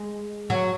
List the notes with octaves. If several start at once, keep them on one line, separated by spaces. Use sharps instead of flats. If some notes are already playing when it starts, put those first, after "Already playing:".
Already playing: G#3
F#3